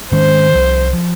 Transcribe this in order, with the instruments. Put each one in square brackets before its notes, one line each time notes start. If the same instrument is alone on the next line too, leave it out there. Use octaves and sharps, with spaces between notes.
[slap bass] G#2 D#3 G#3 C#4 [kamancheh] C5
[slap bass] C2 C3 F3
F3